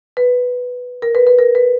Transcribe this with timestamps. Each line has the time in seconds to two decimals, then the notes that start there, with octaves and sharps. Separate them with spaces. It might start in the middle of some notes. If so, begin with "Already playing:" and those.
0.17 B4
1.02 A#4
1.15 B4
1.27 B4
1.39 A#4
1.55 B4